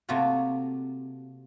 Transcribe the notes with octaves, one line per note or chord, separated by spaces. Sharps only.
C3 A3 A#3 F4 F#4